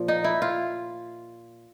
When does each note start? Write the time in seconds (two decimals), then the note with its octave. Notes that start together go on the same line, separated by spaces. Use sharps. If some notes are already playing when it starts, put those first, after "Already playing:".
Already playing: A#2 F3
0.08 D#4
0.24 E4
0.42 F4